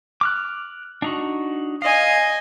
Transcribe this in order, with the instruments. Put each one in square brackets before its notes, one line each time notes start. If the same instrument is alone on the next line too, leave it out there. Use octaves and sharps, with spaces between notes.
[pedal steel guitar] D6 F6 F#6
D4 D#4 F#4
[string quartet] D#5 G#5 [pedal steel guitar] F5